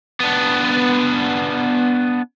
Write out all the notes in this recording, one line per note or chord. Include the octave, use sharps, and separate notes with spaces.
B3 D4